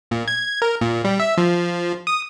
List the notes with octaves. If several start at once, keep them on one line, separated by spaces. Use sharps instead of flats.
A#2
G#6
A#4
A#2
G3
E5
F3
D#6